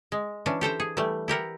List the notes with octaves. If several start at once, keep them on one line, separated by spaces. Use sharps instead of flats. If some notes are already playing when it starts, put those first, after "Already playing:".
G#3
E3 C#4 D4
G4 A4 C5 G5
G#4
E3 G3 A3
E4 G4 A#4 F#5